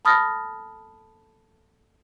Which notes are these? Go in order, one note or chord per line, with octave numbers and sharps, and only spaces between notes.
A5 B5 D#6 F6 A6 A#6